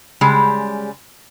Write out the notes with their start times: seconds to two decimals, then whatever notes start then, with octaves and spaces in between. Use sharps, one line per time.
0.21 C#3 G3 G#3